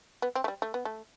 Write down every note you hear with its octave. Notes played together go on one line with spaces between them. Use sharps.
B3
C4
A3
G3
A3
B3
A3